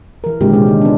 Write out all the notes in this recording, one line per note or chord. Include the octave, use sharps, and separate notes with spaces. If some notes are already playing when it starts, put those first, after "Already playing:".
E3 A#4
A#2 D3 D#3 G#3 C4 G4
C3 G#3 C#4
D#3 D#4
B3 D4